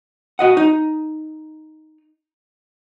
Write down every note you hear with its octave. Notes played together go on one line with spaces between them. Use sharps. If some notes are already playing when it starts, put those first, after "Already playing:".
F#4 D#5 F#5
D#4